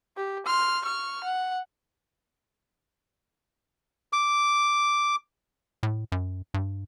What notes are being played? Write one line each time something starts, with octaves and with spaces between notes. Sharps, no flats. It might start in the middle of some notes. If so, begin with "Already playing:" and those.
G4
C6 F6
C#6 F6
F#5
D6
A2
F#2
G2